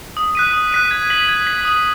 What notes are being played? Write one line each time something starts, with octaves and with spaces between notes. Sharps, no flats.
D#6
F#6 B6 D#7
D#6
F#6 B6 D#7
G#6
B6 F#7
G#6
B6 F#7
D#6